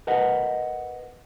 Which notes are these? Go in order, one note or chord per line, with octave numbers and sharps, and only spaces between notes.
A#4 B4 D#5 F#5